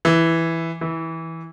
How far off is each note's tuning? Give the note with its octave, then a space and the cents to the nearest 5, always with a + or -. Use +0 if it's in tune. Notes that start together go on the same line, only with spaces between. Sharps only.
E3 +0
E3 -15